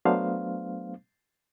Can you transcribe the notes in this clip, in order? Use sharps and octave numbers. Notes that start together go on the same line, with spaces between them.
F#3 A3 B3 D4 C5 F5